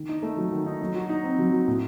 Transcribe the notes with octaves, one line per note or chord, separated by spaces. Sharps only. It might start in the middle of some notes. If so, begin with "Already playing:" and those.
Already playing: D#3
D#4
A3
F#3
D#3
D#4
F#3
F#4
D#4
C4
F#3
F#4
A2